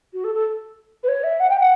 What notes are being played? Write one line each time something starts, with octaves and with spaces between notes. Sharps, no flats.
F#4
A4
A4
B4
C#5
E5
F#5
G5
F#5